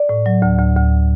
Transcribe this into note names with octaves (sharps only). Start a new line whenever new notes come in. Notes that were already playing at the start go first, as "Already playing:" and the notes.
Already playing: D5
A2
F#3
D2
D2
D2